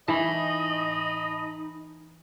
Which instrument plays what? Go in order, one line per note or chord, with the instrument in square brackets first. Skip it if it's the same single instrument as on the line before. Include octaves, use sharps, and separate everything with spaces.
[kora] E3 [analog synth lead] D#4 [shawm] D#5 [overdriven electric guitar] A5 B5